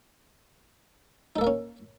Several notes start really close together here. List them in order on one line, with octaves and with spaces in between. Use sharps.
D#4 A4 A#3 A#4 C#4